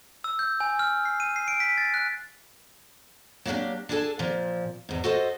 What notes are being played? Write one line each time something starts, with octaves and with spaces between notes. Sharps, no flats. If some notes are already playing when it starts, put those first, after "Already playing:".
E6
G6
G#5
F6
C7
D#7
C7
D7
B6
A6
F#6
F#3 G3 A#3 C4 D4 G4
D4 E4 G#4 A4 G#5 A5
A#2 F3
E2 G#2
F#4 A4 C5 D#5